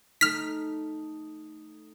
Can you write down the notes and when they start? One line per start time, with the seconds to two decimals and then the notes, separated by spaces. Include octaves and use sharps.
0.21 A3 D#4 F6 B6